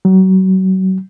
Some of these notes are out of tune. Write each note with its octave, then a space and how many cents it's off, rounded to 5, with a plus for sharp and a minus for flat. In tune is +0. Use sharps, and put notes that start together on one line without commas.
F#3 +30